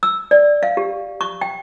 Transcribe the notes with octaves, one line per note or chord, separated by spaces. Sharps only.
E6
D5
F5
G4
C#6
G5